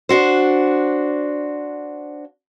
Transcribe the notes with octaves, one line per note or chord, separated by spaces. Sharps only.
D4 F#4 C5